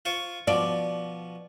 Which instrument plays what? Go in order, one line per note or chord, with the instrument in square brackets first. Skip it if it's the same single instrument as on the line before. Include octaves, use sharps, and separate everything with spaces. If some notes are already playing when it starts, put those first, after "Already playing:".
[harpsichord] F4 C5 C#6
[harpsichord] B2 F3 [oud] D5